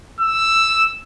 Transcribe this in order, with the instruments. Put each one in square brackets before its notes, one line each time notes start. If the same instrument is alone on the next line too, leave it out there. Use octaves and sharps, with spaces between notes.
[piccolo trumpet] E6